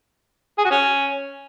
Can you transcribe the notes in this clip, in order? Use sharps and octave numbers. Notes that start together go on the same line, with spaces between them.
G#4
F#4
C#4